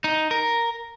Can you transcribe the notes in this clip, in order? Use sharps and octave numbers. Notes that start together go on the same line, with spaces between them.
D#4
A#4